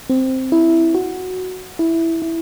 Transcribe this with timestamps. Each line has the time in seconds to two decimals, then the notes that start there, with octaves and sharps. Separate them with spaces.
0.10 C4
0.52 E4
0.94 F#4
1.79 E4
2.22 E4